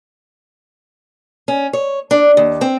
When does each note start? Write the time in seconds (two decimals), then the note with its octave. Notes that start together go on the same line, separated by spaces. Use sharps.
1.48 C#4
1.73 C#5
2.11 D4
2.37 D#2
2.61 C4